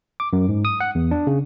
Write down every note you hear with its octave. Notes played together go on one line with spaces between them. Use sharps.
D6
F#2
G#2
D#6
F#5
E2
D4
C#3